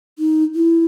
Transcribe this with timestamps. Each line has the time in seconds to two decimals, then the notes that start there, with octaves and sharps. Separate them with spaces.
0.19 D#4
0.55 E4